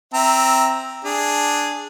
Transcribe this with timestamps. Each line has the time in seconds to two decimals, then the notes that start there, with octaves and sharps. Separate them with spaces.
0.14 C4 E5 A#5
1.05 D4 G#4